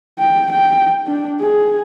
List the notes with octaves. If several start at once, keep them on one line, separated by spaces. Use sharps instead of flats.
G5
G5
D4
G#4